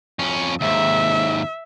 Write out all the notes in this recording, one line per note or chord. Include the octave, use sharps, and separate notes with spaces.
F2 C#4
D#2 G#2 E5